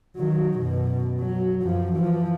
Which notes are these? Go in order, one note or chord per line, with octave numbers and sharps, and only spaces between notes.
D#3 F#3
F#2 B2
F#3
F#2 F3
E3 F3